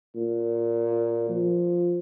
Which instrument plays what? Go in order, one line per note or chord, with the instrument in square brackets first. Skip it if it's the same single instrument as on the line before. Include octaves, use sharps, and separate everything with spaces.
[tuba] A#2
F3